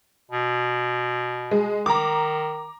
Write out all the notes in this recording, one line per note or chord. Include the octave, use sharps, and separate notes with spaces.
B2
G#3
D#3 A#5 D6